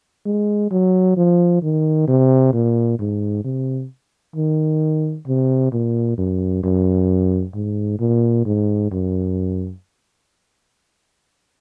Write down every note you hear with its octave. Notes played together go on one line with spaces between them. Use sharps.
G#3
F#3
F3
D#3
C3
A#2
G#2
C3
D#3
C3
A#2
F#2
F#2
G#2
A#2
G#2
F#2